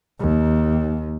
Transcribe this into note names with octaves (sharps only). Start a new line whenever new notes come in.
D#2